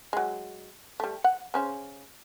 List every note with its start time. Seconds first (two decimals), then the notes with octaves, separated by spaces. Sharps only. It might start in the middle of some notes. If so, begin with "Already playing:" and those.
0.13 F#3 G#3
1.00 G3 A3
1.24 F#5
1.54 C#3 C#4 C5